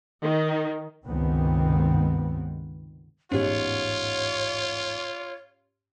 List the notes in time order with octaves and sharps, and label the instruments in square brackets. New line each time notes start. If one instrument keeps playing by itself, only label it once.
[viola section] D#3
[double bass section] C#2 G2 C3 D#3 B3 C4
[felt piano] A1 E2 G#2 [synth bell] C#4 G4 [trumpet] F4 [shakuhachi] C#5